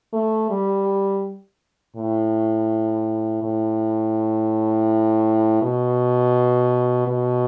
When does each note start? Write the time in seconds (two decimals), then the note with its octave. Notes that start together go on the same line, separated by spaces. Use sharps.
0.13 A3
0.50 G3
1.96 A2
3.43 A2
5.62 B2
7.07 B2